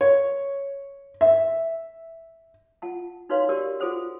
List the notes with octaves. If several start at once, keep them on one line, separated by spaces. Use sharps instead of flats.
C#5
E5
F4 F#5 A5
D#4 F#4 B4 C#5 F5 C6
F#4 G4 A#4 D5
F4 F#4 G#4 A4 C5 F#5